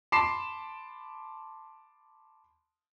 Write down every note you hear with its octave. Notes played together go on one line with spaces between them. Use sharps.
A5 B5 C6 D6 C7 E7